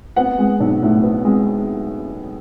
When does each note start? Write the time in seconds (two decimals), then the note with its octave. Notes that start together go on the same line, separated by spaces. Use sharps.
0.16 B3 F#5
0.38 G#3
0.60 B1
0.82 A2
1.03 B3
1.25 G#3